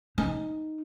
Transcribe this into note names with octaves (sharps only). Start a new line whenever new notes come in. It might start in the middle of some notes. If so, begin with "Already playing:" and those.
D#4